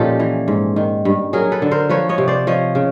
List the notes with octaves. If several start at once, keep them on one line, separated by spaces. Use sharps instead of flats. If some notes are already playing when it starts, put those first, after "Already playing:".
Already playing: A#2 F3 C#4 D#4 G4 A4
E3
G#2
D#3
G2
F#3 G#4 A#4
A4 B4
D3
A#4 C5
F3 B4 C#5
C#5 D#5
C3
C5 D5
F3 C#5 D#5
C#3